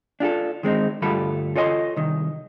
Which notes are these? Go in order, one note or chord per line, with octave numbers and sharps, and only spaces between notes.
D4 F4 G4 A4
D#3 G#3 C4 D#4
D2 G2 G3 F4 A4 B5
F4 A4 C#5 D#5 F#5 C6
C2 D#3